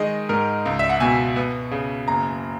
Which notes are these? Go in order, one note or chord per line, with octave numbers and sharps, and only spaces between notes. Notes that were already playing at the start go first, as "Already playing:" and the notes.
Already playing: D#3 G#3 D#5
G#2 A#4
C#2
E5
F#5
B2 G#5
B3
C#3
F#1 A#5